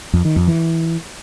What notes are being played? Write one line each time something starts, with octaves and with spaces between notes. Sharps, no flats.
F2
D#3
F2
E3